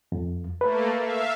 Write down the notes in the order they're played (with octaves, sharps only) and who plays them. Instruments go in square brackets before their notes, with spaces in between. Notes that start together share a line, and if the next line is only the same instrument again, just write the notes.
[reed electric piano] F2
[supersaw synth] A3 A#3 [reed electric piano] B4
[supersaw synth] E5 F5